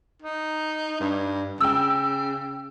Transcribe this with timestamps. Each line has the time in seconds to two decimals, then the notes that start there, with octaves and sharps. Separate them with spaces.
0.22 D#4
1.00 G2
1.60 C#3 G5 E6